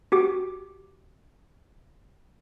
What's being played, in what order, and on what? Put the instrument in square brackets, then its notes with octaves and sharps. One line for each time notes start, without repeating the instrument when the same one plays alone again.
[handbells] F#4 G4 D6